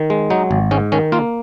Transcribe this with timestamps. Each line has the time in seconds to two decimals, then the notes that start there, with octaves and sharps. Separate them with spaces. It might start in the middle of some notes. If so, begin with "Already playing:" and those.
Already playing: D#3
0.10 G#3
0.30 F#3 D#4
0.51 G#1
0.71 G#2 C#4
0.92 D#3 C#4
1.12 A#3 F4